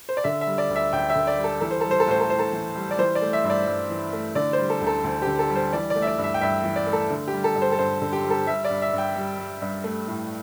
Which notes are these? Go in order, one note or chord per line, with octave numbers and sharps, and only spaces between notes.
C5
D5
D3 E5
E5
G3
D5
D2
E5
D2 G5
E5
D3
D5
G3
A4
E3 A4
C5
G3 A4
C5
A4
A2 C5
A4
A2 C5
A4
E3
G3
D5
E3 C5
D5
A3
E5
G2
D5
G2
E3
A3
D3 D5
C5
G3
A4
D2
A4
D2
G4
D3
A4
G3
C5
E3 D5
D5
A3
E5
D5
G2
E5
G5
G2 E5
E3
D5
A3
A4
D3
G4
G3
A4
G2
C5
A4
G2 C5
D3
G4
G3
A4
G3 E5
D5
G2
E5
G2 G5
G3
G3
G2
A3
A2